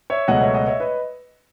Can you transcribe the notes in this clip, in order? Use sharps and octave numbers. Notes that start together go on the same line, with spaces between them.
C#5 E5
C#2 B2 F#3 A3 D#5 F#5
C#5 E5
D#5 F#5
C#5 E5
B4 D#5